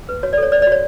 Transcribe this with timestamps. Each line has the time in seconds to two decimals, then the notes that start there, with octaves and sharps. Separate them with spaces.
0.09 B4
0.23 F#4 C#5
0.33 D5
0.37 A4
0.43 C#5
0.52 C5 D5
0.62 D5
0.67 F#4 C#5